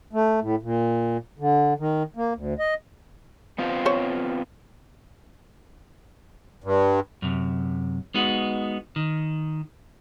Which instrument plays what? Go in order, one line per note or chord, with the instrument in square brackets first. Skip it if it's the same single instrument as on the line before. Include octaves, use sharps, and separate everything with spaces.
[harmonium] A3
A2
A#2
D3
D#3
A#3
D2
D#5
[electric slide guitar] B3 C4 F4
[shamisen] C5 C#5
[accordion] G2
[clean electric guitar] F#2 C3
G#3 B3 D#4 F#4
D#3